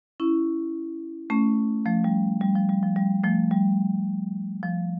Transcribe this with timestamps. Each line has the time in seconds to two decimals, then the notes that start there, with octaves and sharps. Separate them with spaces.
0.20 C#4 E4
1.30 A3 C#4
1.86 F3 A3
2.04 G3
2.41 G3
2.55 F3
2.69 G3
2.83 F3
2.96 G3
3.24 F3 A3
3.51 G3
4.63 F3